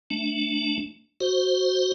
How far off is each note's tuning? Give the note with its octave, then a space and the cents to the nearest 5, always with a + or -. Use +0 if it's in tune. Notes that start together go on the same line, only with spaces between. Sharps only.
A3 +0 D4 +0
F#4 +0 C5 +0